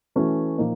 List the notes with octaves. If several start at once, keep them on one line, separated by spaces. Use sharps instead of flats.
E3 A3 C#4 F#4
A#2 F3 A#3 D#4